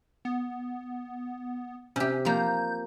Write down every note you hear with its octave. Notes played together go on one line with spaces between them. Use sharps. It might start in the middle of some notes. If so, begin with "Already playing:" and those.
B3
C3 C#4 G4
F3 A#3 G6